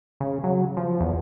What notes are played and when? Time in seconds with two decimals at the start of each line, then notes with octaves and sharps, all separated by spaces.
0.20 C#3
0.44 F#3
0.77 F3
1.00 E2